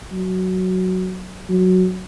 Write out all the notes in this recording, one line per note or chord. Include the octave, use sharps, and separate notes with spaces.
F#3
F#3